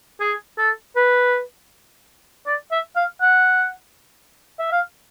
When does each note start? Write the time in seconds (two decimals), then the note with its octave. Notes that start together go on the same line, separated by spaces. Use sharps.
0.21 G#4
0.58 A4
0.96 B4
2.47 D5
2.72 E5
2.96 F5
3.22 F#5
4.59 E5
4.72 F5